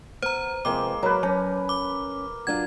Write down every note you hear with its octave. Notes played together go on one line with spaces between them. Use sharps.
B3 C5 A#5
C3 F3 G#3 A#3 B4 D6
F#3 A#4 B4
F#3 C#4
D6
F#3 D4 F4 G#6